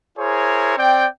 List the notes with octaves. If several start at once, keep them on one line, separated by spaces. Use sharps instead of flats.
E4 G#4 A#4 C5 C#5
C4 D5 G5